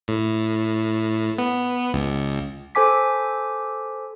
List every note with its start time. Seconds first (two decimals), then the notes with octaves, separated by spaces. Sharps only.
0.08 A2
1.38 B3
1.94 C#2
2.75 A4 C5 G#5 D6 B6